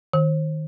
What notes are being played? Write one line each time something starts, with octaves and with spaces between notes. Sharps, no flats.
D#3